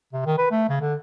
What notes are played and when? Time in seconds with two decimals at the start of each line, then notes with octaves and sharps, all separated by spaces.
0.13 C3
0.26 D#3
0.38 B4
0.51 A3
0.69 C#3
0.81 D3